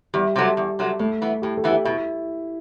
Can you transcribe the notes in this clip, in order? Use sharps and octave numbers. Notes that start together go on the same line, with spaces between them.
E2 G3
C3 F#3 A3
E2
C3 F#3 A3
A2 A3
E3 B3
A2 G4
A4
E3 B3
G4
B2 E4